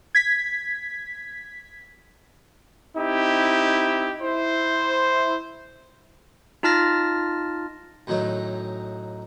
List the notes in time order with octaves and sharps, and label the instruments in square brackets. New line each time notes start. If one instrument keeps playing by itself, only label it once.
[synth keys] G#6 B6
[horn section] C4 D#4 E4 G4
E4 C5
[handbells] D#4 F4 A5 F6 A6 A#6
[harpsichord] F#2 A2 D#3 F#3 D#4